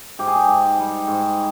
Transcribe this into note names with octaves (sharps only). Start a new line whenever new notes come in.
G#2 G4
G#4
G4
G#2
G3
G#2